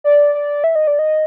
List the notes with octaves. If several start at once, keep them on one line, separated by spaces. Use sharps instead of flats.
D5
D5
E5
D#5
D5
D#5